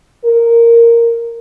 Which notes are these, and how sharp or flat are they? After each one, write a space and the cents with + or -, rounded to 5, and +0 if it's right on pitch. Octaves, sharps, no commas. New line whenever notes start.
A#4 -5